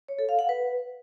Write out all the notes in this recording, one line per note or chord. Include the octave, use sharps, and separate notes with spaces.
C#5
A4
F5
F#5
B4